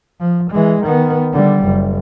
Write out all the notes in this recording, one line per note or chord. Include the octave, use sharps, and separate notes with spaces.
F3
E3 G#3
D#3 B3
D3 G3
F#1